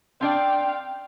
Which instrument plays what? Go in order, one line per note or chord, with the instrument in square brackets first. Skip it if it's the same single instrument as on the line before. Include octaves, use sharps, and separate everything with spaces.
[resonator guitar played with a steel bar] C4 D4 D5 [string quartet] F5 G5